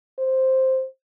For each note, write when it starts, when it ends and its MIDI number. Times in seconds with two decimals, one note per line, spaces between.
0.19 0.85 72